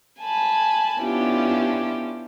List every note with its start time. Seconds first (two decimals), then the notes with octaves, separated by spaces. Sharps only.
0.20 G#5 A5 B5
0.99 B3 C#4 D4 E4 F4 G4